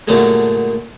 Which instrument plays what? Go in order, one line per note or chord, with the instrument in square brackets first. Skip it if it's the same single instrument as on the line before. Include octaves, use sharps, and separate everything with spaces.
[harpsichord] G2 A#2 D3 F#3 G#3 A3